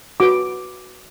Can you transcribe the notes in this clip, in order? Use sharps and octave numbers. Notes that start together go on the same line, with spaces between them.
F#4 B4 D6